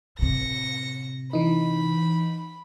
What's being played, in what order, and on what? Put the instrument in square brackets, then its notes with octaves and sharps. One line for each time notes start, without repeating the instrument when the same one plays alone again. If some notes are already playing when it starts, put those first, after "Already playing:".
[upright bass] A2 C3 [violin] A#6 C#7
[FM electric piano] E3 D#4 [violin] B5